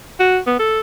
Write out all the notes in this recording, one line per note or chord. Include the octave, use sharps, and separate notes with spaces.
F#4
B3
A4